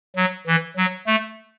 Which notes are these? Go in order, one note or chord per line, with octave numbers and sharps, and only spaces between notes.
F#3
E3
F#3
A3